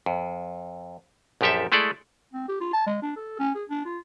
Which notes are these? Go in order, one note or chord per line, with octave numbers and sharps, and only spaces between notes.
F2
A#1 F#2 F3 G4 A4 E5
G#3 A3 E4 G#4 A4 D5
C4
G4
F4
A5
G#3
D4
A4
C#4
G#4
D4
F4